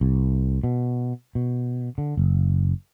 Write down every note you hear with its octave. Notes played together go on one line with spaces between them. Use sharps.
C2
B2
B2
D3
F#1